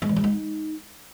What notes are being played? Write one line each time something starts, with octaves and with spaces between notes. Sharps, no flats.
G#3
E3
G#3
D#4